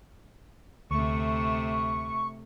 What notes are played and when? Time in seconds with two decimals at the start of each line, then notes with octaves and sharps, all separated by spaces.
0.91 D2 C3 A3 C#6